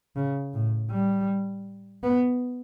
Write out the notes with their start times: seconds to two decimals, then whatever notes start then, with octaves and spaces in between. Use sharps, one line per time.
0.16 C#3
0.53 A2
0.91 G3
2.03 B3